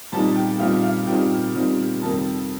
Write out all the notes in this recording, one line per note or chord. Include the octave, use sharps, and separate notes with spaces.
A#2 G3 C4 D#4 A5
G5
A#2 G3 C4 D#4 F5
F5
A#2 G3 C4 D#4 G5
A#2 G3 C4 D#4
F2 C3 D#3 G3 A#3 A5